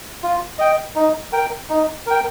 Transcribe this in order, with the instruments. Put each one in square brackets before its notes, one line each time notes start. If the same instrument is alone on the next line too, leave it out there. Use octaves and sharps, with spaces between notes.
[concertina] F4
D#5 G5
D#4
A#4 G5
D#4
A#4 G5